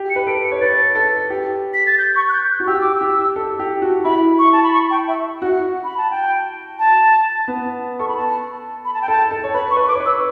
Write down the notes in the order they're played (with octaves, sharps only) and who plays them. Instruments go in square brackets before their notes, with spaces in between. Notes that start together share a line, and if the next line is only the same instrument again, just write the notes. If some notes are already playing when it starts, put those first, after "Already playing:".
Already playing: [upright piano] G4
[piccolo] C#7
[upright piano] B4
[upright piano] A4 [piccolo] D7
[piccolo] C#7
[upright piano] C#5
[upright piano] B4 [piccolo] A6
[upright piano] A4
G4
[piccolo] B6
A6
G6
C#6
F#6
G6
F#6
[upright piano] F#4
[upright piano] G4 [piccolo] E6
[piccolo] D6
E6
[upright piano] G4
A4
G4
F#4
[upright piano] E4 [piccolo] B5
[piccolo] C#6
A5
B5
C#6
G5
E5
[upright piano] F#4 [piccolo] F#5
[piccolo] B5
A5
G5
A5
[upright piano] B3
[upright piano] A4 [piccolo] C#6
[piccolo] B5
A5
B5
A5
G5
[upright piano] A4 [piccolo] A5
[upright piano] A4
C#5
[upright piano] B4 [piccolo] B5
[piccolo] C#6
[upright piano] B4
[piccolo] C#6
D6
[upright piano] C#5
B4
[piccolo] E6